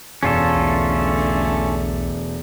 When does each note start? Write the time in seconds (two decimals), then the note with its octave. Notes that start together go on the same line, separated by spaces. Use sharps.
0.23 E1 F#2 C#4 F4 A4
0.56 B1 D3 A3